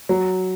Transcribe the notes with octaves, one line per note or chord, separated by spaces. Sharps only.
F#3